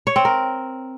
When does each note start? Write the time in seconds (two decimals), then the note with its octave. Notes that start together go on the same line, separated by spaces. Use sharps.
0.07 C#5
0.16 C4
0.25 A#4